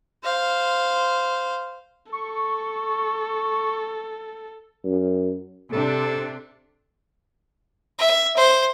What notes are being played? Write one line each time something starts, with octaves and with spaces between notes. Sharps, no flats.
C5 F5
A4 C#6
F#2
C3 D4 A4
E5
C5